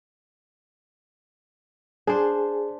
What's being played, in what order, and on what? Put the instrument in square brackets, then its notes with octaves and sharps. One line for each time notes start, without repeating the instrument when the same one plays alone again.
[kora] D4 C5 [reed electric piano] G#4